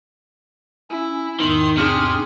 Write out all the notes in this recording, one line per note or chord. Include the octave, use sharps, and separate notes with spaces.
C#4 E4
E2 G#2 D#3 C6
C3 D4 G#4 F6